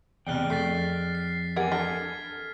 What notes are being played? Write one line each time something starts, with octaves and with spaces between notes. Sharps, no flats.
E2 C3 G#4 D5 G5 F6 F#6 G7
F2 A3 A6 B6 C7
C7
E2 G4 A#4 F#5 G#5 G#6
D4 A4 F6 B6